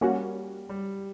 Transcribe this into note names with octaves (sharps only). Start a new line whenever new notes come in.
G3 A#3 C#4 F#4
G3